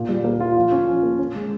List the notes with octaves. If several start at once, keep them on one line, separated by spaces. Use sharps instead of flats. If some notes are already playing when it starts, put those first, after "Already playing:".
Already playing: A#2
G3
A#3
F4
F3
C#4
F3
A#3
C#4
G#3